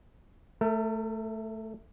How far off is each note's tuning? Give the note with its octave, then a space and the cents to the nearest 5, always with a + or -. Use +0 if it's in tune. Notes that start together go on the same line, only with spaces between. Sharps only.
A3 +0 A#4 -40